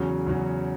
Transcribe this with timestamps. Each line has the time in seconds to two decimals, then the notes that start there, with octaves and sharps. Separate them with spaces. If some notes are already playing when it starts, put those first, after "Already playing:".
Already playing: E2 C#3 F#3 C#4 F#4
0.27 E2 C#3 F#3 C#4 F#4